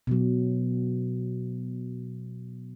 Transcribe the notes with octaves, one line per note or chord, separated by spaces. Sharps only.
B2 F#3